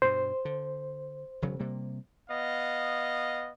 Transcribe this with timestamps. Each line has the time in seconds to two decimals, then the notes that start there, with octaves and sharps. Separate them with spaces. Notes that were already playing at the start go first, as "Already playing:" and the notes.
0.02 G2 B2 C5
0.45 D3
1.42 E1 C#3 F#3
1.59 C3 G3 A#3
2.30 B3 D#5 F5